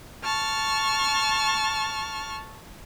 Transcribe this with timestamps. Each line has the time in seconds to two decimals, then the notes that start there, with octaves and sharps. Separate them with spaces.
0.23 A5 C#6 F6